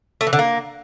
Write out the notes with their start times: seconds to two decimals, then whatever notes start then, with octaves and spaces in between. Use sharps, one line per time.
0.21 A3
0.27 E3
0.33 D3
0.39 A#3